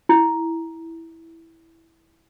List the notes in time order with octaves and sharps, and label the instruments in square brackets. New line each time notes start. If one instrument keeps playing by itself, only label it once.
[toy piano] E4